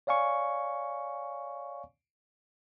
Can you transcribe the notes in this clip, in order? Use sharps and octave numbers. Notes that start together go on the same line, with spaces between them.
C#5 D5 F5 G#5 C#6